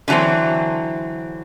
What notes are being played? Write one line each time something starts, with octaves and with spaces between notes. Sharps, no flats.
D3 E3 F#3 A3 C4